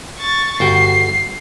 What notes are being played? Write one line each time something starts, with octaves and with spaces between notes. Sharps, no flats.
C#6 A6
G1 F#4 G5 C7